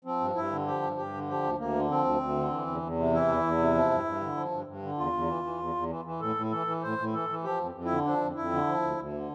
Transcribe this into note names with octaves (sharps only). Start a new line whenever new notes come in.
F3 C4
G2
G2 E4
D3
F3 G4
G2
G2 G4
D3
F3 G4
D2
D2 A#3
D3
F3 C4
D2
D2
D3
E3
E2
E2
C3
E3 E4
E2
E2
C3
F3
G2
G2
D3
F3
G2
G2
D3
E2 F4
E2
E3
E3
E2
E2
E3
E3
A2 A4
A2
E3 A4
E3
A2 C5
A2
E3 A4
E3
F3 G4
F2
F2
E4
D3
F3 D4
F2
F2 E4
D3
F3
D2
D2
D3